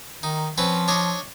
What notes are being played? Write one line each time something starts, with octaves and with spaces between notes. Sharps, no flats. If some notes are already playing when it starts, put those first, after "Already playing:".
D#3 D#4
F3 C4 C#4 B4
D4 C#5 D#5